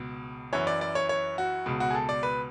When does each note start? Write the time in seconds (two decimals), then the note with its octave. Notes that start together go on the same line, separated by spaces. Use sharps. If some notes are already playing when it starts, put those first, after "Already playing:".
Already playing: C#2 B2
0.53 F#2 E3 C#5
0.67 D5
0.81 D5
0.95 C#5
1.09 C#5
1.38 F#4
1.66 C#2 B2
1.80 F#4
1.90 G#4
1.95 A4
2.09 D5
2.23 B4